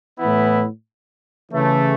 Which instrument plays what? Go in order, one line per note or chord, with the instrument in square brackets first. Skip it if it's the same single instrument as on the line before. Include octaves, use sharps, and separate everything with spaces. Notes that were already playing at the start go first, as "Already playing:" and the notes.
[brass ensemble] A2 E3 B3 E4
C#3 E3 A3